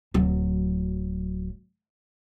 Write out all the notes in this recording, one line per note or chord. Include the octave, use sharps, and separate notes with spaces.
D1 F#3